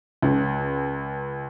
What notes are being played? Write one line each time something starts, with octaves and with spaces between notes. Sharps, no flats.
C#2